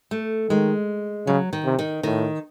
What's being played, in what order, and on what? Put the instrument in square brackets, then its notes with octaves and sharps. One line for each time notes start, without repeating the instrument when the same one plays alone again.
[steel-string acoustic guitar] A3
[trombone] D#3 [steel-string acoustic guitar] G#3
[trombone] C#3 [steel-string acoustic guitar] F#3
[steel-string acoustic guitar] D#3
[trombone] C3
[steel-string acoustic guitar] D#3
[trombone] A2 [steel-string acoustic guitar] D#3